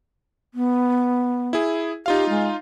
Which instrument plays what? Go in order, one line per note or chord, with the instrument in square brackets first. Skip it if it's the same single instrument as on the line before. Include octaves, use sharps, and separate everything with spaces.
[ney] B3
[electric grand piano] E4 G#4
[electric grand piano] D#4 F4 F5 [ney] G4
[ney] G#3